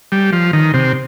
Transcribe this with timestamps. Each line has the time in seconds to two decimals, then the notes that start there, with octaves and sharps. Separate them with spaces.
0.12 G3
0.33 F3
0.53 D#3
0.74 C3